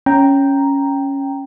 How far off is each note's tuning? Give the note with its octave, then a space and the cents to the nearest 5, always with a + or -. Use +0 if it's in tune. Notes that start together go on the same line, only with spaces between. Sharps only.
C#4 +0 G5 +0 A#5 +0